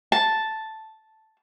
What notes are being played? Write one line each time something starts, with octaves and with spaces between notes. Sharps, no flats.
A5